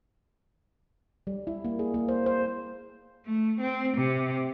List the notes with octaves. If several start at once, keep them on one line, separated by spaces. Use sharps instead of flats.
G3
E4
A#3
G#4
A#3
C5
C5
A3
C4
C3